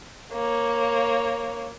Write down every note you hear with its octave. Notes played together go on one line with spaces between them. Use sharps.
A#3 C#5